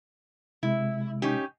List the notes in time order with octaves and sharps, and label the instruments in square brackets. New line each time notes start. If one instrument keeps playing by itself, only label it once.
[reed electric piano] C3 G#3 [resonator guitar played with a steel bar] E4
[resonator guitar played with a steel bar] C#4 D#4 G4